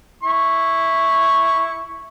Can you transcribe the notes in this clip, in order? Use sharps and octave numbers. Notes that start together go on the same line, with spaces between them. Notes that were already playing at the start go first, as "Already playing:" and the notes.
E4 C#6